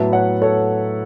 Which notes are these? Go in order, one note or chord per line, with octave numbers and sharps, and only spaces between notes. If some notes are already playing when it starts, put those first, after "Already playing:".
Already playing: A2 F#3 B3 E5 A5
C#5 F#5
A4 C#5